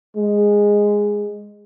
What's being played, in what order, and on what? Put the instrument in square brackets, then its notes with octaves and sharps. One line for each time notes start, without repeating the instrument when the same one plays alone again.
[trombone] G#3